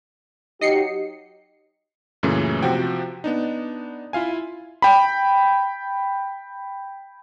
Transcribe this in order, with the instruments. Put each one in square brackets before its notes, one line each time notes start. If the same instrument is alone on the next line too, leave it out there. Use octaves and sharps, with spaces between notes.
[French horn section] F#3 D#4 G4 [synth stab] D#5 C7 C#7
[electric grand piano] F#2 A#2 C#3 E3 A3 C#4
C3 F3 F#4 G5
B3 D4 D#4
E4 F4 F5 G#5
G5 B5